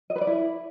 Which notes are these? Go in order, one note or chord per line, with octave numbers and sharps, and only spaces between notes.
D#5
B4
D5
E4